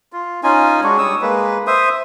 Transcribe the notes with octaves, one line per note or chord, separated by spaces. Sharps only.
F4
C#4 D#4 F4 G#5
G#3 D4 F#4 C#5
G3 C#5 D#6 E6
G#3 A#3 B4
C5 E5 D#6